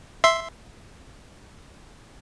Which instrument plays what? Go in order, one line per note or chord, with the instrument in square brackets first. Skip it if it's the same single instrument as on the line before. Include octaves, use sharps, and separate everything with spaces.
[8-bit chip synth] E5 C6